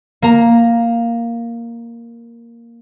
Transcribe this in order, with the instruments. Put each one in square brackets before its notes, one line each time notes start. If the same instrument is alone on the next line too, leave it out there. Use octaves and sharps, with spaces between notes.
[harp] A#3 A#5